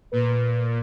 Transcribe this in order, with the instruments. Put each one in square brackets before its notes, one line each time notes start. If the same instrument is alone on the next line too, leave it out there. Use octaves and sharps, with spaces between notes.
[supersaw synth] A#2 [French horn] B4